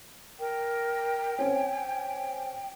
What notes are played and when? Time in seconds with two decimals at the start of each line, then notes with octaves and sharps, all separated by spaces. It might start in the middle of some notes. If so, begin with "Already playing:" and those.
0.39 A#4 G5
1.39 C4 C#4 G#5